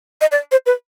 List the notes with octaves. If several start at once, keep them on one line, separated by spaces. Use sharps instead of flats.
D#5
D5
C5
B4